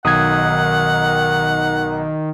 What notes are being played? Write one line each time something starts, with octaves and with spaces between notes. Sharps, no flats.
B1 D#3 F#5 D#6 G#6